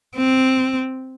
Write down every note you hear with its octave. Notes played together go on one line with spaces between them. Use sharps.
C4